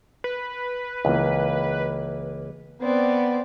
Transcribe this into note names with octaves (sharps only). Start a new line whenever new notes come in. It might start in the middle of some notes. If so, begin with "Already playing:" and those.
B4
C#2 E3 A#3
B3 C4 D5